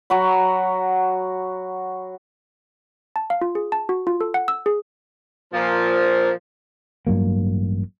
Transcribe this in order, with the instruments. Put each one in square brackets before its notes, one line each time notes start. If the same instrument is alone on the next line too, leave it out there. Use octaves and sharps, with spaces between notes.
[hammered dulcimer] F#3 F#4 B5
[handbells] A5
F5
F4
G#4
A5
F#4
F4
A4
F#5
E6
G#4
[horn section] A#2 F3
[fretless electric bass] A1 G2 F#3 A#3